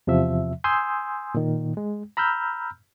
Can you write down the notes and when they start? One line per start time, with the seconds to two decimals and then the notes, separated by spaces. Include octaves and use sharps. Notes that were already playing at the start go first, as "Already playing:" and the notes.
0.07 E2 C3 F3 E5
0.64 G#5 C6 D#6 E6 G6
1.35 A#2 D#3
1.77 G#3
2.17 A#5 B5 E6 F6 G6